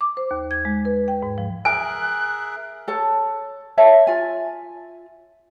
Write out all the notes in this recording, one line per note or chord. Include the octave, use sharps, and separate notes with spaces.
D6
C5
D#2
G#6
G#3
B4
G5
G#2
F3
G#4 A#4 E5 G#5 F#6
A4 C#5 A5
C#5 E5 A5
F4 G#5